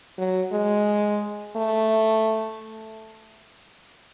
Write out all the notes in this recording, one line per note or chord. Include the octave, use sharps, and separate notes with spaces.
F#3
G#3
A3